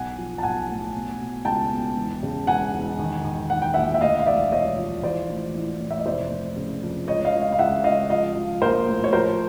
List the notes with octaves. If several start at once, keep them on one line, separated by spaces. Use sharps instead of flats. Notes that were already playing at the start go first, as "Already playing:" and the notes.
Already playing: B1 F#5 G#5
F3
A5
B1 F#5 G#5
A2
B2
B2
C#2 G5 A5
B2
E1
C#3
E1 F#5 G#5
E1
D#3
D#3
D#3 F#5
G5
A#1 E5 F#5
E5
D2 D#5 F5
F5
E1 D5 E5
E1 C#5 D#5
F3
E3 C5 D5
A1
A1
A2
E5
D#5
F1 C5 D5
F1
C#3
F2
C#2 C#5 D#5
D#5 F5
C#2
D#5 F5
F5
C#2 E5 F#5
C#2 D#5 F5
F3 D#5 F5
F3
A#1 A#4 C5
A2
C#5
F3 A#4 C5